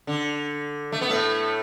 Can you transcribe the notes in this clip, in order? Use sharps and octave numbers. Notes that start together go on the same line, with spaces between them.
D3
A3
B3
A2 A3